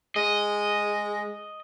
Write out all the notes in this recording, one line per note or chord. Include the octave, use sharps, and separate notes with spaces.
G#3 D#5